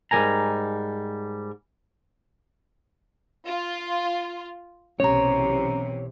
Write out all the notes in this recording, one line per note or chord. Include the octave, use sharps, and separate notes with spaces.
G#2 G3 G#3 A#4 G#5 A#5
F4
B1 C3 E3 C#4 C#5 A#5